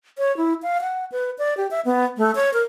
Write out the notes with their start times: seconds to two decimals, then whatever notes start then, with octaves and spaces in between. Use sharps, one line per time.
0.18 C#5
0.37 E4
0.63 F5
0.82 F#5
1.12 B4
1.38 D5
1.57 G4
1.71 E5
1.85 B3
2.18 A3
2.35 C#5
2.53 A#4